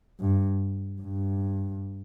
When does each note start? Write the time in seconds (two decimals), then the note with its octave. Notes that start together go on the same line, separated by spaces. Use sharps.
0.20 G2
1.01 G2